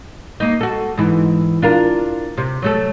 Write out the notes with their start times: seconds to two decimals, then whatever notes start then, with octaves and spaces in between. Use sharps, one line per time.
0.40 A#3 D#4
0.61 F#4 A4
0.97 G#2 E3
1.62 D4 F4 A#4
2.37 C3
2.62 F#3 A3 A4